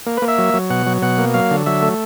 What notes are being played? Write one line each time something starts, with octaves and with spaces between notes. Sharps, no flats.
A#3
B4
A#3
E5
F#3
F#3
B2 F#5
F#3
B2 F#5
A#3
F#3 F5
D3
F#3 E5
A3